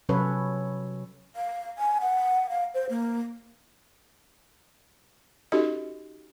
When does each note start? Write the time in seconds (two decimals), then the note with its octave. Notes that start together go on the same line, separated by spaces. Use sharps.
0.09 C3 F#3 C#4 A4 B4 C#5
1.36 F5
1.78 G#5
2.01 F#5
2.49 F5
2.74 C5
2.90 A#3
5.52 C#4 D#4 F#4 G4 A4 D#5